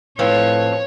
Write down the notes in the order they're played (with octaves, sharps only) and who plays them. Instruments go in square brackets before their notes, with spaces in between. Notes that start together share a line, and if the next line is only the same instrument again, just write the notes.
[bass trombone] A2 [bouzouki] F3 C4 [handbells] B4 [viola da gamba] C#5